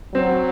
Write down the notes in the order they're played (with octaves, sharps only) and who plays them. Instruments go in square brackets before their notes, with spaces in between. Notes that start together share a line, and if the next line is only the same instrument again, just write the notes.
[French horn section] F#3 [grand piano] C4